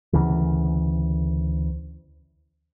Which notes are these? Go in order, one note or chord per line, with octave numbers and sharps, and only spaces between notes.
D2 C#3 E3